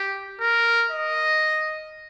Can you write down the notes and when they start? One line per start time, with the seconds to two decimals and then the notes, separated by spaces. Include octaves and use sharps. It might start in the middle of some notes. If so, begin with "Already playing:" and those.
Already playing: G4
0.41 A#4
0.91 D#5